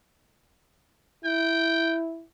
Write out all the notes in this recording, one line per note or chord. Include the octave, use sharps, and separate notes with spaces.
E4 G5